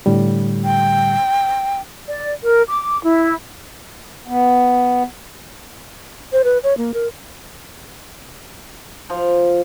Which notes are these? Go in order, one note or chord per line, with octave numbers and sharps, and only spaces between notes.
A2 D3 G3
G5
D5
A#4
D6
E4
B3
C5
B4
C#5
A#3
A#4
F3